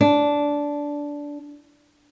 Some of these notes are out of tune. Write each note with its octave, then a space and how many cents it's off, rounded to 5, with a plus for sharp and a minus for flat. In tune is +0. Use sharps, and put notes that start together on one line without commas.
D4 -10